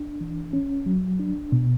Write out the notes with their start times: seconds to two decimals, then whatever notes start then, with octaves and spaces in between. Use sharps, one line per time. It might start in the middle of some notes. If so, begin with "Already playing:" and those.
Already playing: D4
0.21 E3
0.53 C#4
0.86 F#3
1.19 D4
1.52 B2